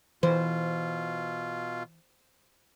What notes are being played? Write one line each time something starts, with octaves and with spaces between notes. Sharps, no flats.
B2 E3 F4 C5